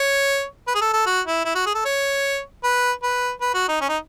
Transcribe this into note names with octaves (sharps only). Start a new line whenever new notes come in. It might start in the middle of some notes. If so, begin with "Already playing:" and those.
Already playing: C#5
B4
G#4
A4
A4
F#4
E4
E4
F#4
G#4
A4
C#5
B4
B4
B4
F#4
D#4
C#4
D#4